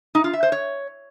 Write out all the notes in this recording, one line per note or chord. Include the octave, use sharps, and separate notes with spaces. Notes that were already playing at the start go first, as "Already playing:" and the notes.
D#4
F4
E5
C5
C#5